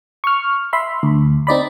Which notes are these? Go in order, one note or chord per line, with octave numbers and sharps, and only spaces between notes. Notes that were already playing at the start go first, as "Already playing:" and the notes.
C#6 F6
E5 B5 C6
D2
C4 D#4 D5 B5